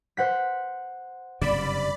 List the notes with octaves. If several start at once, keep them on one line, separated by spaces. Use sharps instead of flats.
C5 F#5 B6
F#1 G2 C3 D5 B5